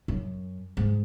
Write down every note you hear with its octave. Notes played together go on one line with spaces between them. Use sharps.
F#2
G#2